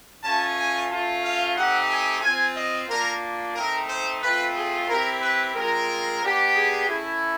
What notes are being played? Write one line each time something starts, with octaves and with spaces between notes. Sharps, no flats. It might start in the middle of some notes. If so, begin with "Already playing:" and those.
A3 C#4 F4 A5
G#5
A3 C#4 F4 A5
F5
A3 C4 D#4 G4 F#5
G#5
C4 F4 G#5
D#5
A#3 D4 F4 A#4
A3 C4 D#4 A#4
C5
A3 C4 F4 B4
G#4
C4 E4 G4 A#4
B4
G#3 C4 F4 A#4
B3 D4 G4
G#4
A3 C#4 E4